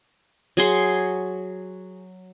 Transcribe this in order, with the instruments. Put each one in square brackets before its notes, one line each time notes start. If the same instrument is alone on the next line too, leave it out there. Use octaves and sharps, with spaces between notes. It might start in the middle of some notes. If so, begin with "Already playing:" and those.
[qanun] F#3 G#4 C6 C#6